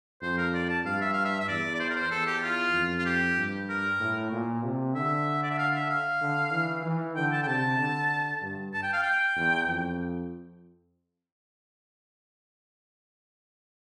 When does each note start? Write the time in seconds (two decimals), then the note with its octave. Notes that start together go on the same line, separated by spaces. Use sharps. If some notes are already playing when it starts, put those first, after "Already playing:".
0.22 F2 C5
0.38 A#4
0.54 D5
0.70 A5
0.85 G2 F5
1.02 E5
1.13 F5
1.25 E5
1.40 E5
1.49 E2 D5
1.75 D5
1.80 C5
1.90 A#4
1.96 C5
2.11 E2 A4
2.27 G4
2.43 F4
2.74 F2
2.99 F4
3.06 G4
3.38 G2
3.70 A#4
4.00 A2
4.32 A#2
4.64 C3
4.95 D3 E5
5.43 D5
5.51 E5
5.58 F5
5.74 E5
5.90 F5
6.21 D3
6.52 E3
6.85 E3
7.16 D3 G5
7.32 A5
7.43 G5
7.48 C3 A5
7.79 D3
8.42 G2
8.74 A5
8.83 G5
8.93 F5
9.03 G5
9.36 E2
9.69 F2